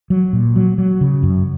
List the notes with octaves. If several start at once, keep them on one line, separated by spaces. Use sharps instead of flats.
F#3
A#2
F#3
F#3
C#3
F#2